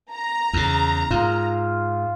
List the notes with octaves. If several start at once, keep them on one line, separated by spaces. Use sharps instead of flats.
A#5
E2 C#3
G#2 F4